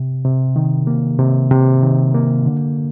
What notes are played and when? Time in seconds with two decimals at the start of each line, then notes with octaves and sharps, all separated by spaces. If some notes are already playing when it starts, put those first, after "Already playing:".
Already playing: C3
0.25 C3
0.56 D#3
0.87 A#3
1.19 C3
1.51 C3
1.82 D#3
2.14 A#3
2.46 D3